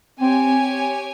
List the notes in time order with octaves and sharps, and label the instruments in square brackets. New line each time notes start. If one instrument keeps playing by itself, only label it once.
[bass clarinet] C4 [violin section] G4 C#5 G#5